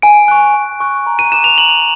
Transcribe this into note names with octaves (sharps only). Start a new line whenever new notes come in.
G#5 D7
C#6 F#6
G#5
C#6 F#6
A#5
D#7
D6 F#6 E7
F7
A#5 F#7